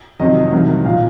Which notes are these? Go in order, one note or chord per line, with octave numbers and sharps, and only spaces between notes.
F2 C3 D#3 F#3 D#5
C2 C3 D#3 F#3
A#2 F3 F5